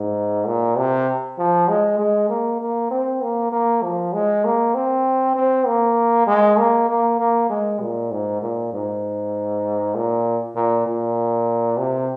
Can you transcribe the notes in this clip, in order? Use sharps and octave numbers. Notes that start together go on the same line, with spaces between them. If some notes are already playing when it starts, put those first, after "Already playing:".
Already playing: G#2
A#2
C3
F3
G#3
G#3
A#3
A#3
C4
A#3
A#3
F3
G#3
A#3
C4
C4
A#3
G#3
A#3
A#3
A#3
G#3
A#2
G#2
A#2
G#2
A#2
A#2
A#2
C3